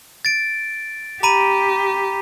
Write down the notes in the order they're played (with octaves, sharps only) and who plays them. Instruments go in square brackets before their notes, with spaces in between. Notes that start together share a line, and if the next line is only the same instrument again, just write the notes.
[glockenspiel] A6 D7
[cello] G4 [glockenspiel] A#5 B5 D#7